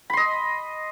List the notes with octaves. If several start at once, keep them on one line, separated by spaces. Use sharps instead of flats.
D#5 B5 C6